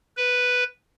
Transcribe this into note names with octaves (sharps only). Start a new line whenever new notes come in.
B4